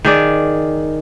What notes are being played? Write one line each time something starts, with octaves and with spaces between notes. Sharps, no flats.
D#3 G#4 D5